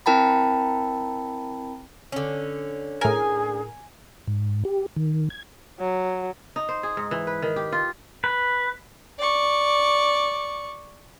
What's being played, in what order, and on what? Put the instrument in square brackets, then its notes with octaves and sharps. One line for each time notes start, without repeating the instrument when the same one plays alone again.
[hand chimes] C4 E4 A#4 G5 A5 B5
[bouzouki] D3 C#4
[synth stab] A2 A#4 [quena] G#4 [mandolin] G#5
[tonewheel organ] G#2
G4
D#3
G#6
[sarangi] F#3
[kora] D#4
C5
G#4
G#2
E3
B4
D#3
G4
F4
[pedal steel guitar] B4
[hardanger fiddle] D5 C#6